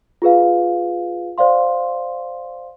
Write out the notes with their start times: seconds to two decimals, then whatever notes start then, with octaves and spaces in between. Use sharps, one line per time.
0.22 F4 G#4 B4 F5
1.38 C5 D5 F5 C6